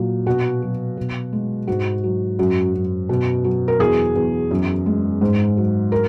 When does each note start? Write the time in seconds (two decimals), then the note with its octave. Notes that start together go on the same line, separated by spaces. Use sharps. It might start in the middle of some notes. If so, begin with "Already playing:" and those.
Already playing: A#2 F#3
0.26 B2 F#4
0.62 F#3
0.97 B2
1.33 G#3
1.67 G#2 F#4
2.03 F#3
2.39 F#2 F#4
2.74 F#2
3.09 B2
3.44 F#3
3.68 A#4
3.80 E2 G#4
4.16 E2
4.51 F#2
4.86 G#3
5.21 G#2
5.57 F#3
5.92 A#4